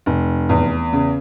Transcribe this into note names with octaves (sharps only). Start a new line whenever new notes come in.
F1
E2
C#3